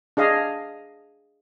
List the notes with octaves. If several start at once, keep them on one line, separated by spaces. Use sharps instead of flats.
D4 G#4 D#5 F5